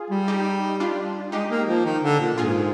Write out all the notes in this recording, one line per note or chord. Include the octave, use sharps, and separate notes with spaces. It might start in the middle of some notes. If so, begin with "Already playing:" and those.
Already playing: F4 G#4
G3
D#4 G4
D4 F4
G#3 D#4 G4
A#3
F3
D#3
D3
A#2
G#2 F4 G#4